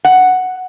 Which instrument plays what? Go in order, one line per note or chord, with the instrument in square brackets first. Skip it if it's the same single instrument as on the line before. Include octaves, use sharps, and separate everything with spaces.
[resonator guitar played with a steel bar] F#5